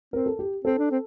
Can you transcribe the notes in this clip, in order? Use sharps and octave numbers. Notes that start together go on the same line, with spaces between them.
C4 A#4
A4
G4
C4 A4
D4
C4